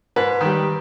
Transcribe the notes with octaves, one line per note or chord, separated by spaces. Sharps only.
G#2 B4
D#3 G3